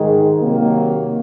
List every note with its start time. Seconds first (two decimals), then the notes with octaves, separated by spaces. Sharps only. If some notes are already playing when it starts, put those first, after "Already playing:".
Already playing: G#2 D#3 G#3
0.41 C3 D#3 F#3 A#3